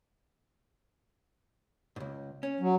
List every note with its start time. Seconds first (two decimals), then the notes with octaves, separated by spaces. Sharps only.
1.96 C#2 G#2
2.43 C#4
2.60 F#3